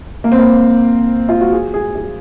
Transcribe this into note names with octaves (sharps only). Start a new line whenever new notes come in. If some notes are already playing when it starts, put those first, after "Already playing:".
A#3
C4
A#3
F4
F#4
G#4
G#4
G#4